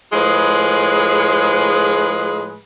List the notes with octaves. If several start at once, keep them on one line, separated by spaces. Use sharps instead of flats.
A2 F3 G#3 G#4 B4